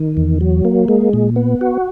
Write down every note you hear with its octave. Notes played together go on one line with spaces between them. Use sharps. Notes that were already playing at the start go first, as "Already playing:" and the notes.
Already playing: D#3
E2
F#3
A#3
G#3
A#2
B3
F#4